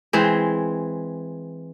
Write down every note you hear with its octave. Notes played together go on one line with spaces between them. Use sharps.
E3 G#3 C4